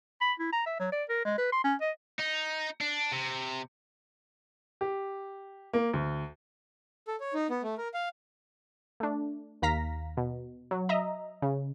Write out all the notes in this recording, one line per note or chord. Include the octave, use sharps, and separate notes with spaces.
B5
E4
A#5
E5
F#3
D5
A#4
G#3
B4
C6
C#4
D#5
D#4
D4
C3
G4
A#3
D2
A4
C#5
D#4
B3
A3
A#4
F5
A3 D4
D#2 F5 A#5 A#6 B6
B2
F#3
D#5 E5 A#5
C#3